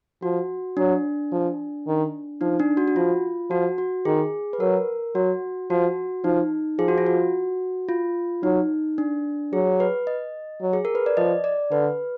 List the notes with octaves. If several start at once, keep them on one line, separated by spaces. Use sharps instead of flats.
F3 F#4
F#3 D4
F3
D#3
F3 D#4
D4
F#4
F#4
F3 F4
F3 F#4
F#4
D#3 G#4
B4
F#3 A#4
F#3 F#4
F3 F#4
F3 D#4
F3 G#4
F#4
F4
F#4
F4
F#3 D#4
D4
F#3 G#4
B4
D#5
F#3
G#4
A#4
B4
D5
F3 D#5
D5
D3 B4